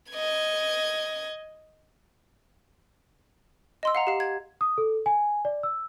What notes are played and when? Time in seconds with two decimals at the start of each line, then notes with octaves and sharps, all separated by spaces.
0.12 D#5 G#6
3.83 D#5 C6 E6
3.95 F5 F#5 A#5
4.07 G4 F5
4.20 G#6
4.61 D#6
4.78 A4
5.06 G#5
5.45 D5
5.63 E6